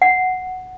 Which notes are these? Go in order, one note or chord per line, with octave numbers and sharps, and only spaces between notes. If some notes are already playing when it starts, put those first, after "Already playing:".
F#5